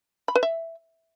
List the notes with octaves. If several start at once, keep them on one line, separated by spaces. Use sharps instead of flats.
B5
B4
E5